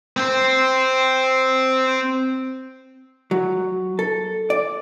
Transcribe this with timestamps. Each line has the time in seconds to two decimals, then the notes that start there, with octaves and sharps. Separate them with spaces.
0.17 C4 C5
3.31 F#3
3.99 A4
4.50 D5